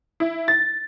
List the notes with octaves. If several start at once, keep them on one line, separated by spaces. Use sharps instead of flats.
E4
A6